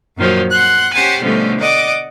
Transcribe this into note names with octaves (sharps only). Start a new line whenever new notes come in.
F#2 A#2 D#3 F3 F#3
F#5 C6 F#6
C#4 G4 C5 F#5 G#5 A5
B2 D3 F3 G3 A3 C#4
D5 D#5 F#5 D6